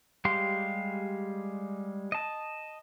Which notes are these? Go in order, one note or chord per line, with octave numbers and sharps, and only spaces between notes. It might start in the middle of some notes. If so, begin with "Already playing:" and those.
G3 G#3 G4 F5 C6
D#5 A5